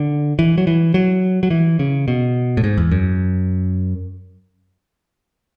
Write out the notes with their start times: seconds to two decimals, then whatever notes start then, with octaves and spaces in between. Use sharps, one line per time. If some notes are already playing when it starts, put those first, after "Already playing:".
Already playing: D3
0.39 E3
0.58 F#3
0.67 E3
0.94 F#3
1.43 F#3
1.50 E3
1.79 C#3
2.08 B2
2.57 A2
2.64 G#2
2.78 E2
2.91 F#2